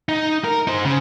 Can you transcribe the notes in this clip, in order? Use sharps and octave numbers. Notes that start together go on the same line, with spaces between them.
D#4
A#4
D#4 C5
C#3